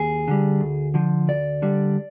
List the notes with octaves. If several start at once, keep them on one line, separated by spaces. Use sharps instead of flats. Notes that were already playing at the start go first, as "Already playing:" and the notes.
Already playing: D#2 G#4
D3 G3
D2
D3 F3
D2 D5
D3 G3